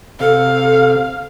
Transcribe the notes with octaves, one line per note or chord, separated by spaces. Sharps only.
C3 A4 F5